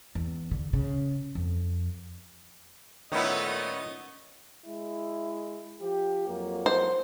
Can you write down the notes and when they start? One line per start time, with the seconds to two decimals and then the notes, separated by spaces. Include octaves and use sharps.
0.15 E2
0.51 D3
0.73 C#3
1.35 F2
3.12 A#2 D#3 A3 B3 C#4 E4 D#5
4.66 G#3 E4
5.81 F3 G4
6.27 F2 F#3 A#3
6.66 C5